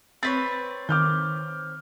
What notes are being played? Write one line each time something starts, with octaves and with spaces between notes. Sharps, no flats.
C4 B4 C#5 A6
D#3 D6 F6 G6